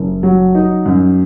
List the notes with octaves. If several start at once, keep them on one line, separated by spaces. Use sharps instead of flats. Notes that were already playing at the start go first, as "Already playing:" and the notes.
Already playing: F#1
F#3
D#4
F#2